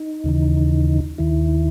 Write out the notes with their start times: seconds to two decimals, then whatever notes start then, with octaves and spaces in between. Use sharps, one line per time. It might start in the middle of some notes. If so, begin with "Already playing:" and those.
Already playing: D#4
0.24 D#2 C#3 E3
1.18 D#2 D#3 E4